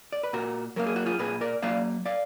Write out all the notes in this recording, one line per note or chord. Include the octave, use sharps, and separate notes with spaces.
D5
B4
A#2 F#4 A#4
F#3 A#3 A#4
G#4
F#4
F4 G#4
A#2 G#4 B4
A#4 D5
F#3 A#3 D5 F5
D5 F5